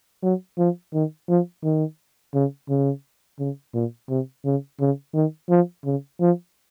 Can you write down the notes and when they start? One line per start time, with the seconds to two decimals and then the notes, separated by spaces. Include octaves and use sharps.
0.23 F#3
0.58 F3
0.93 D#3
1.29 F3
1.63 D#3
2.34 C#3
2.69 C#3
3.39 C#3
3.74 A#2
4.09 C3
4.45 C#3
4.80 C#3
5.14 D#3
5.49 F3
5.85 C#3
6.20 F3